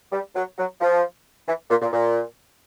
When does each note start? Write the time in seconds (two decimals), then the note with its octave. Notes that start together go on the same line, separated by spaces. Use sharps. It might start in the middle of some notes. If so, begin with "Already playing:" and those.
0.12 G3
0.36 F#3
0.58 F#3
0.81 F3
1.48 E3
1.70 A#2
1.82 A#2
1.93 A#2